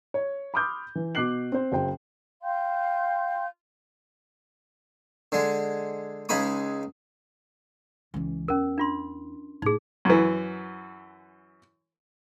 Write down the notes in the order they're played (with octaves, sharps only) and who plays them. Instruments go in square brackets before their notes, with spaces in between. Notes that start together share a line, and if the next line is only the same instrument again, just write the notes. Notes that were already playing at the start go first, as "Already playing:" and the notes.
[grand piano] C#5
B5 C6 D6 D#6 F6 G6
E3
B2 D6 F#6 C7 F#7
C4 C5
F#1 F#3 C5 G5
[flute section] F5 G5 C6 G6
[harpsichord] D3 G#3
C#2 G#3 D#4 B5 D#6
[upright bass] C#2 E3
[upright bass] E2 [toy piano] C#4 A#4
[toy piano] D4 F4 C6
[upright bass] A2 F4 [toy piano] D#4 G#4
[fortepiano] F#2 E3